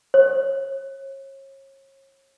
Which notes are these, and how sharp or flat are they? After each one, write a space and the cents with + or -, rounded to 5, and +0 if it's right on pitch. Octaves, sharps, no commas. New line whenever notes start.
C#5 -35